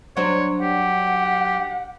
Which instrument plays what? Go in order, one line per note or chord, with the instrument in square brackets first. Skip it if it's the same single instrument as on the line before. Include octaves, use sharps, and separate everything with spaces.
[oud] F#3 D4 C5 [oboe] C#5
[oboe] G4 [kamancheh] F#5